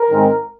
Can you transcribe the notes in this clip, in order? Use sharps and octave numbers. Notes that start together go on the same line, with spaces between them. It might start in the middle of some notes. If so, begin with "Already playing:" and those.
Already playing: A#4
G#2 D#3 G#3 C4